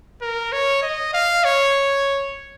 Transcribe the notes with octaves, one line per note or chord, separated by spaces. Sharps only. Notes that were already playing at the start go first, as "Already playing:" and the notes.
A#4
C#5
D#5
F5
C#5